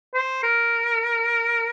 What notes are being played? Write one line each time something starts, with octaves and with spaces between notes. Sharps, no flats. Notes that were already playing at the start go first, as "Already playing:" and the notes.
C5
A#4